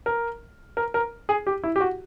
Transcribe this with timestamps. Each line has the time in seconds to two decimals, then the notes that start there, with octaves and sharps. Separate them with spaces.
0.06 A#4
0.77 A#4
0.94 A#4
1.29 G#4
1.47 G4
1.63 E4
1.76 G4
1.80 F#4